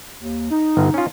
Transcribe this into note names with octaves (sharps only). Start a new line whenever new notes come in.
D#2
D#4
G1 G2
C#4 F4